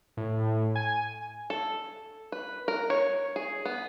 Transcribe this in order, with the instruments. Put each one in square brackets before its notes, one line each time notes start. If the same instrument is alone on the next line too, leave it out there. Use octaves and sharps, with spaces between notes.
[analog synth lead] A2
G#5
[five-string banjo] A4
B4
A#4
C#5
G#4
B3